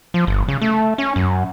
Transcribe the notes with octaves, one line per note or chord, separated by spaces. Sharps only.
F3
G1
C#3
A3
C#4
F#2